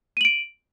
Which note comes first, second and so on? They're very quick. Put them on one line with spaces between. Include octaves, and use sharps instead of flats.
D#7 F#7 D7